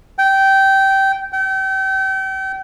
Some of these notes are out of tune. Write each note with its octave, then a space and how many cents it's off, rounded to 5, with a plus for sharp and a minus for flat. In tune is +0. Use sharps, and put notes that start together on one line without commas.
G5 -15
G5 -35